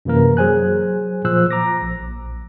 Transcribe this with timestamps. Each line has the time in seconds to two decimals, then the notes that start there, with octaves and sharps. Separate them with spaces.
0.05 F#2 C3 E3 A#3 A#4
0.37 F#3 G#4 C5 G#5 F#6
1.25 A#2 F3 C5 E6 F#6
1.51 A#5 D6 A#6
1.82 A#1